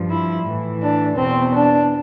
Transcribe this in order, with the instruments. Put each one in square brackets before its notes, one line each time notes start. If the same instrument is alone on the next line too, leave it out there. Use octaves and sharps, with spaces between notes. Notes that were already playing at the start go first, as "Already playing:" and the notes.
Already playing: [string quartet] G2 F3
E4
A2 E3
D4
E2 B2 C4
D4